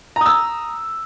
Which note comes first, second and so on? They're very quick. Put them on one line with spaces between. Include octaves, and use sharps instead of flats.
A#5 D#6 E6